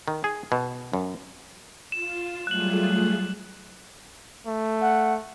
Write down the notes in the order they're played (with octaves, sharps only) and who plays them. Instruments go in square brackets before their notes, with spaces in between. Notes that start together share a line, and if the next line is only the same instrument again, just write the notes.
[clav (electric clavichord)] D#3
G#4
B2
F#2
[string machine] F4 [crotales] E7
[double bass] F#3 G3 [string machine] A3 F4 G#4 [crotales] F#6 F#7
[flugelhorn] A3
[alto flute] F#5